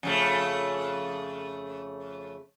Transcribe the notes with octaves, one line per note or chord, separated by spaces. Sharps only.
F2 C#3 A3